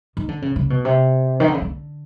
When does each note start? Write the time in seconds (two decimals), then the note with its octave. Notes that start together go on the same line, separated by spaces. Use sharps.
0.17 D#3
0.28 D3
0.42 C#3
0.56 C#3
0.70 B2
0.85 C3
1.40 D#3
1.48 D3
1.54 C#3
1.61 D3